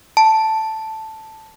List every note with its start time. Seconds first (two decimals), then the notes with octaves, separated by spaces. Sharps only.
0.17 A5